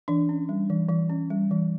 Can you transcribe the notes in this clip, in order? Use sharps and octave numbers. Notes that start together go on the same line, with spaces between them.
E3 D4
C#4
G3
E3
E3
C#4
G3
E3